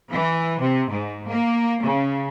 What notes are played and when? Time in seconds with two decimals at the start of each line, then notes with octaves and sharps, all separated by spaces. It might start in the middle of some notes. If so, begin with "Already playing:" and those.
0.10 E3
0.59 C3
0.90 G#2
1.28 A#3
1.83 C#3